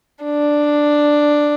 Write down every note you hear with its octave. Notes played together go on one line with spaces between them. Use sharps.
D4